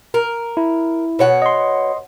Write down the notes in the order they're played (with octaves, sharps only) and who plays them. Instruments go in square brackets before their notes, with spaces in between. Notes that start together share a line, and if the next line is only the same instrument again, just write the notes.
[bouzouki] A#4
[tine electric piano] E4
[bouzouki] B2 C#5 F#5
[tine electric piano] D#5 C6